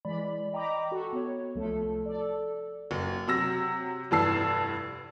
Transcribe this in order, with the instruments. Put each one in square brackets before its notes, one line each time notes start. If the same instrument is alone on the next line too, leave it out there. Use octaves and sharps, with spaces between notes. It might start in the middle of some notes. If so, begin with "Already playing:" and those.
[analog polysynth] E3 G#3 D5 B5
D#5 G5 A#5 B5 D6
F#4 A4
B3 C#5
C2 F3 A3 A4
A4 D5
[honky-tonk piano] F#1
C3 F#3 E6 A#6
F1 G2 E3 A5 E6 C7